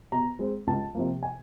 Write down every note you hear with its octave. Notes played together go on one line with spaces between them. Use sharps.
B2 A#5
G#3 C4
C#2 A5
C3 F3 A#3
G#5